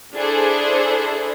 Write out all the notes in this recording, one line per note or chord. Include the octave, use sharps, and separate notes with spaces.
D4 E4 G#4 A4 C5